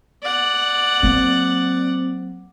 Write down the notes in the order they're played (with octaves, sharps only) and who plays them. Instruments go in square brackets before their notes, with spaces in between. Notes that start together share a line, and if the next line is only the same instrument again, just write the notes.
[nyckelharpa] D5 F#5
[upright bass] F#3 A#3 [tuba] C4